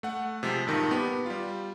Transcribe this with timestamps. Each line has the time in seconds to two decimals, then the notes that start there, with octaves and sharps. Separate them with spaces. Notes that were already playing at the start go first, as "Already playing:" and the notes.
0.03 A3 F#5
0.43 C3 F3 G#3
0.67 G2 A#2 D#3 A5 A#6
0.91 B3 G4
1.26 G3 F4